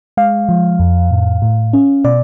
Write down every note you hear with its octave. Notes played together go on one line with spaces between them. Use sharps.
G#3 F5
F3
F2
A2
A2
C#4
B2 D5